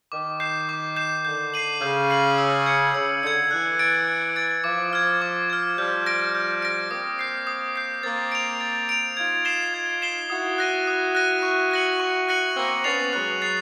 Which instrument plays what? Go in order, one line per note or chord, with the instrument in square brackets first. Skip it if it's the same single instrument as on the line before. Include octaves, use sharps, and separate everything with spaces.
[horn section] D#3 [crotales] D6
[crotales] G6 C7 E7
D6
G6 C7 E7
[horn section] D3 [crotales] G6
[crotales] C7 D#7 F#7
[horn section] C#3 [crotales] G6
[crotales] C7 D#7 F#7
E6
G#6 C#7
[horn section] C#3 [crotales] E6
[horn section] D3 [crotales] G#6 C#7
[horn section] E3 [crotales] F#6
[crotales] A6 D7
F#6
A6 D7
[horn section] F3 [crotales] D6
[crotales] F6 G#6
D6
F6 G#6
[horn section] F3 G3 [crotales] G6
[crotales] A#6 D7
G6
A#6 D7
[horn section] A#3 C4 [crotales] D#6
[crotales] G6 C7
D#6
G6 C7
[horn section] A#3 C4 [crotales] A6
[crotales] D7 F7
A6
D7 F7
[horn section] D#4 F4 [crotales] G#6
[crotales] C7 E7 G7
G#6
C7 E7 G7
[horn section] E4 F#4 [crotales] D#6
[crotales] F#6 A#6 D#7
D#6
F#6 A#6 D#7
C#6
F#6 A#6 C#7 F#7
C#6
F#6 A#6 C#7 F#7
[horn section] A#3 C4 [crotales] F#6
[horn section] B3 C#4 [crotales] A6 C7 F7
[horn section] F#3 G#3 [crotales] F#6
[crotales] A6 C7 F7